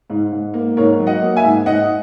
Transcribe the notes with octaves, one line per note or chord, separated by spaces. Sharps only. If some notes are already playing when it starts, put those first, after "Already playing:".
G#2
G#2
A#3
G#2 A#4 C#5
F#3
D#5 F#5
A#3
E5 G#5
G#2
G#2 D#5 F#5